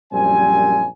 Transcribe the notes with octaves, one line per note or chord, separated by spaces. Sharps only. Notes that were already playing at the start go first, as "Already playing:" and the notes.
A#1 F#2 G3 C4 G#5